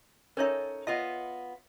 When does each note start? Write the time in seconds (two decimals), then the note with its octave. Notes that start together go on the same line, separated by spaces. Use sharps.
0.37 C#4 D#4 A4 A#4 C#5 E5
0.87 B3 F4 D#5 E5